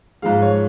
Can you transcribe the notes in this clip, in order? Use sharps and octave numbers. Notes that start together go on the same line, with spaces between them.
G#2 F3 G#3 F5
C#5